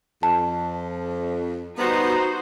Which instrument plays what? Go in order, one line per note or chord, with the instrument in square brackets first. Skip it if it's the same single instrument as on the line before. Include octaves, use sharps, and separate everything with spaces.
[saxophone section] F2 [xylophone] A5
[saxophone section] G3 B3 [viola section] D#4 F#4 C5 [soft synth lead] A#5